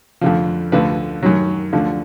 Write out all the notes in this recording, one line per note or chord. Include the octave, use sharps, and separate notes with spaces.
F2 D3 F3
D2 D3 F3 B4
F#2 D#3 F#3
D2 D3 F3